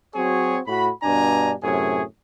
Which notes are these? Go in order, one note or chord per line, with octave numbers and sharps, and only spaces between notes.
F#3 C4 F#4 G#4 C#5
A2 F#4 B5
G2 B2 D4 G#5 A#5
F#2 A2 C3 G#4 C#5